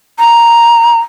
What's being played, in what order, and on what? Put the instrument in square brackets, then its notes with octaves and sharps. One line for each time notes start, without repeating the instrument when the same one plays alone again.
[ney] A#5